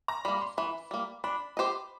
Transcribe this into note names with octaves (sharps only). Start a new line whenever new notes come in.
A#5
G3 A#3 B5
C6
E3 B5
G3 A#3
D4 B5
G4 C5 D#5